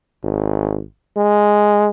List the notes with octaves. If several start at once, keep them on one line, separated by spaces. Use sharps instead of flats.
G#1
G#3